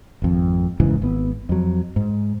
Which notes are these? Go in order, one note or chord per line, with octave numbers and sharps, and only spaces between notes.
G#1 F2
E1 G#2 C#3 E3
G#1 B3
F2 F#3
G#2